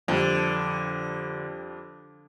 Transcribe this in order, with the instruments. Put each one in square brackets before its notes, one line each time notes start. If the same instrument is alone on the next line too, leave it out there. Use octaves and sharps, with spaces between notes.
[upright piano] F2 G3 [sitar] D3